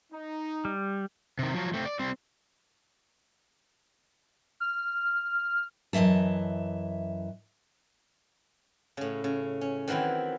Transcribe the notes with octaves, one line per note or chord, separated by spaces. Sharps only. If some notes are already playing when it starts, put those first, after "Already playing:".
D#4
G3
C3 D#3
F3 F#3
A3 C4
D5
G3 C4
F6
F#2 E3 D#5 E5 A5
A2 C#3
C#3
C#4
D#3 E3 F#3 C4 E4